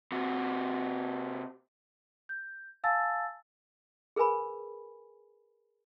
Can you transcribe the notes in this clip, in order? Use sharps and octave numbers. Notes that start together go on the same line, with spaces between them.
C3 F#4
G6
F5 G#5 A5 E6 A6
G#4 A#4 B4 G#5 B5